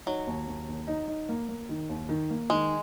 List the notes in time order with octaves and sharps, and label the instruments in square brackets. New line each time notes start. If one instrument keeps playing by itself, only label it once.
[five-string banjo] F#3 [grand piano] D#4
[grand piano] D#2
D#2
D#2
D#4
D#4
A#3
A#3
D#3
D#2
D#3
A#3
[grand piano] D#3 [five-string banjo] G#3